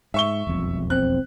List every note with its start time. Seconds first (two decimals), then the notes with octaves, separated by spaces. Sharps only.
0.14 G#2 E5 C#6 G7
0.47 E1 B1 F2
0.90 C4 F#6